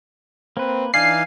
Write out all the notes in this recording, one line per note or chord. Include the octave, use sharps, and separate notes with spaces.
A#3 C4 B4
E3 D4 D#4 D5 F5 G#5 C7